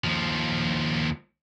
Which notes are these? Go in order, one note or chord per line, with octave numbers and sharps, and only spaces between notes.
D#2 F3